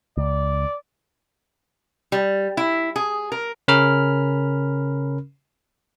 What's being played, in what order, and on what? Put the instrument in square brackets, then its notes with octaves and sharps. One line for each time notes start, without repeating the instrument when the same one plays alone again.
[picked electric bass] C#2 [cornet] D5
[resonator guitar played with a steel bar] G3
E4
G#4
A#4
[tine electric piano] C#3 C#4 A#4 B5 F6